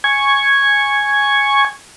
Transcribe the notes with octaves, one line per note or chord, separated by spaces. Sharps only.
G#5 C#6 G#6